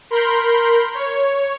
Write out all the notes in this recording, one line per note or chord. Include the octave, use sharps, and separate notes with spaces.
A#4 B5 C6 G6
C#5